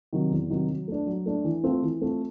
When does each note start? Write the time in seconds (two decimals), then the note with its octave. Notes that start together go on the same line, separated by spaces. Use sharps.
0.13 C3 D#3 F#3
0.31 E2
0.50 C3 D#3 F#3
0.69 F#3
0.88 A3 D4
1.07 F#3
1.26 A3 D4
1.44 E3
1.63 A3 C4 F4
1.82 E3
2.01 A3 C4 F4